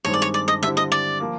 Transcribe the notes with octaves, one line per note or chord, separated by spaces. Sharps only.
G2 D#3 G#3 C4 C#5
D5
C#5
D5
D#5
D3 G3 C4 E4 E5
D#5
D5
F3 A#3